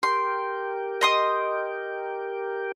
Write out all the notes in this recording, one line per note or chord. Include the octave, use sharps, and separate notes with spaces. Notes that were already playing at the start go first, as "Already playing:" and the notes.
G4 A#4 G5 C6
D#5 C6 D#6